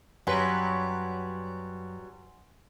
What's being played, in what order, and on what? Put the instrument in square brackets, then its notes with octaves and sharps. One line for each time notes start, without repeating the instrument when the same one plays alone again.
[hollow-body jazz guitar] F#2 [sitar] F#3 G3 B4 [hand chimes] F#5 G#5 C6